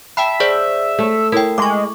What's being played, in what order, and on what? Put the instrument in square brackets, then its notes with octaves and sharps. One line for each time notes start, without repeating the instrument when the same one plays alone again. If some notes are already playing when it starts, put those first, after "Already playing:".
[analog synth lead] E5 [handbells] G5 A5 B5
[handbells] G#4 C5 D5
[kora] A3
[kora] E4 [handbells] A#4 G5
[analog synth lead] G#3 [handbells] C#6 D6